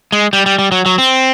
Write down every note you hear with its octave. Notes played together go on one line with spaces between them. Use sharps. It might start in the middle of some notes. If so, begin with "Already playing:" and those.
G#3
G3
G3
G3
F#3
F#3
C4